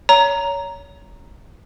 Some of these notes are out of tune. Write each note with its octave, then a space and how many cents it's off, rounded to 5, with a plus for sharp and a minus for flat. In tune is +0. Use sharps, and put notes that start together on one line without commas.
C#5 +25 A#5 +0